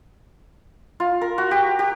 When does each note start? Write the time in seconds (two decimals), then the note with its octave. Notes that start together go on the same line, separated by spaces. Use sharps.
1.00 F4
1.21 A#4
1.38 F#4
1.51 G4
1.79 G4